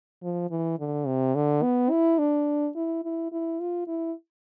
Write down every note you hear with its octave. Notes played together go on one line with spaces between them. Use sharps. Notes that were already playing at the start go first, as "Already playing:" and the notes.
F3
E3
D3
C3
D3
B3
E4
D4
E4
E4
E4
F4
E4